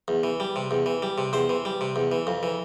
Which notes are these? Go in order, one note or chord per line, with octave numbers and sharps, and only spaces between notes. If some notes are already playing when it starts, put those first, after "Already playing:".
E2
E3
G3
C3
E2
E3
G3
C3
E2 C5
E3
G3
C3
E2
E3
F2
E3